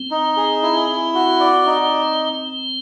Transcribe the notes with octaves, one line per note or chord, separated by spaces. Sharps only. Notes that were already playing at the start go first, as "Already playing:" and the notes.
Already playing: C4
D#4
G#4
E4
E4
F#4
D5
D#4